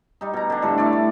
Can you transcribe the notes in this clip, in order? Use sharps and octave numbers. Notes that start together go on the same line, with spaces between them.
G3 D#4
B2 A#5
D3 D4
A2 D3 G3
E4 C#5 D5
A3